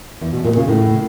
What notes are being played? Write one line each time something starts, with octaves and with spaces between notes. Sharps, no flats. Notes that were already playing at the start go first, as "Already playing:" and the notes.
E2
B2
A#2
C#3
A2